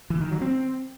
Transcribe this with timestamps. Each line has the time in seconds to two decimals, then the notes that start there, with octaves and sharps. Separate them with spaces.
0.10 E3
0.21 D#3
0.31 F#3
0.41 C4